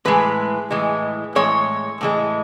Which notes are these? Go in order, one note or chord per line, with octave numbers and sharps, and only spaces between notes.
A2 E3 G#3 B4
A2 E3 G#3
A2 E3 G#3 C#5
A2 E3 G#3